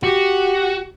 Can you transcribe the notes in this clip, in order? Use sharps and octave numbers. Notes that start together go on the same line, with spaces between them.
F#4 G4